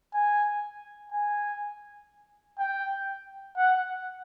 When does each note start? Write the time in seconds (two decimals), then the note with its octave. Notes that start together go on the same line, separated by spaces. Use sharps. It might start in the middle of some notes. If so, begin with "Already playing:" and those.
0.14 G#5
1.12 G#5
2.59 G5
3.57 F#5